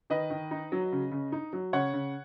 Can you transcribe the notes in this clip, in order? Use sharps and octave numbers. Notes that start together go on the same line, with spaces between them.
D#3 B4 D#5
D#3
D#4
F#3
C#3
C#3
D#4
F#3
C#3 C#5 F#5
C#3